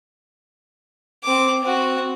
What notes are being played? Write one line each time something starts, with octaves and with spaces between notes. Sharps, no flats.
C4 D6
C4 F#4